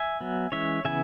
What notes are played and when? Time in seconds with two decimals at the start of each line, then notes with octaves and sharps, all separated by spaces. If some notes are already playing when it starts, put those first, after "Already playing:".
Already playing: E5 G#5
0.21 F#3 B3
0.52 E3 G#3 C#4 C#5 E5
0.85 C#3 E3 B3 E5 G#5